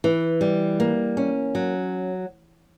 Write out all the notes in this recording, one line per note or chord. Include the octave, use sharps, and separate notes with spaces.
E3
G3
A#3
C#4
F#3